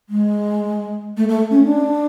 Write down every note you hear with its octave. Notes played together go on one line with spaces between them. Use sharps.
G#3
A3
A3
C#4
D4